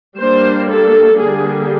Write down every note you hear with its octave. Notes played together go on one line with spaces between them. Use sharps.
G3 A#3 D4 C5
A4
D3 G3 A#3 D4 G#4